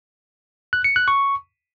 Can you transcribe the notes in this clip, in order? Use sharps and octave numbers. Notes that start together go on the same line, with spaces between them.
F#6
C#7
F#6
C#6